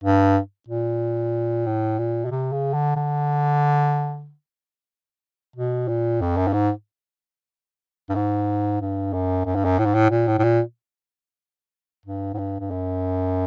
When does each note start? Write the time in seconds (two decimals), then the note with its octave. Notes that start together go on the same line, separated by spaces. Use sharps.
0.04 G2
0.68 A#2
1.66 A2
1.99 A#2
2.25 B2
2.31 C3
2.52 C#3
2.74 D3
2.96 D3
5.56 B2
5.88 A#2
6.21 F2
6.37 F#2
6.47 G2
6.53 G#2
8.09 G2
8.15 G#2
8.81 G2
9.13 F#2
9.45 F#2
9.55 G2
9.65 F#2
9.78 A2
9.85 G#2
9.94 A2
10.10 A#2
10.27 A2
10.39 A2
10.43 A#2
12.06 G2
12.34 G#2
12.38 G2
12.59 G2
12.70 F#2